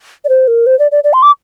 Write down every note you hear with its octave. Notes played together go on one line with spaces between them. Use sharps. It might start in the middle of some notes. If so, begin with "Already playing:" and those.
D5
C5
A#4
C5
D5
D5
D5
C6
D6